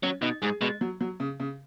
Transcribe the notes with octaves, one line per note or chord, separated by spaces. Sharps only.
F#3 C#4
B2 D#4
G#2 G#4
B2 G#3
F#3
F#3
C#3
C#3